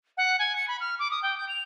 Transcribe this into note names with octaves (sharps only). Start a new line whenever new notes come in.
F#5
G#5
C#7
B5
F6
D6
D#6
G5
G6
F7